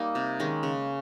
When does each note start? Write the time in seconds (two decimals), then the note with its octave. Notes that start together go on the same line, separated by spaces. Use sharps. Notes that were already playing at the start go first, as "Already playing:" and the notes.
Already playing: G3 A#3 D#4
0.15 C3
0.40 D#3 G#3 C#4
0.63 C#3